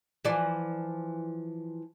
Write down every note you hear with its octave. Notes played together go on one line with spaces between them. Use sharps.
E3 F3 D5